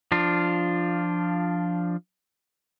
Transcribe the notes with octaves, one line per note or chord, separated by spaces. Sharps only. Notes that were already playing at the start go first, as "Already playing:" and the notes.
F3 D4 F4